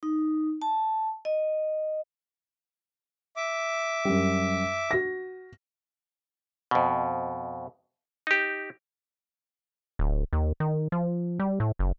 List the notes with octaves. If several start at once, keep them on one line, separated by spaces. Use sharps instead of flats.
D#4
A5
D#5
E5 D6
F#2 G3
F#4 A#6
F2 B2
D#4 G4
D1
D#2
D#3
F3
G3
A2
F#1